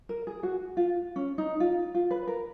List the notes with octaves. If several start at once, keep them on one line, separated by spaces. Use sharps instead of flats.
A#4
G#4
F#4
F4
C#4
D#4
F4
F4
B4
A#4